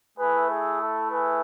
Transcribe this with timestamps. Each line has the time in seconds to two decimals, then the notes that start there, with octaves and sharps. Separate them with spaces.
0.18 A3 E4 G#4 B4
0.49 G#4
0.80 A4
1.11 G#4 B4